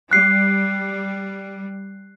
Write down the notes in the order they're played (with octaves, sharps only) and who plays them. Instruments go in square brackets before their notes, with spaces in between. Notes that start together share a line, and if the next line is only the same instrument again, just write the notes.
[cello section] G3 [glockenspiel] F#6 C7